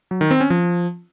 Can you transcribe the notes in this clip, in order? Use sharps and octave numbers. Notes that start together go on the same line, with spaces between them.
F#3
D#3
C4
C#4
F3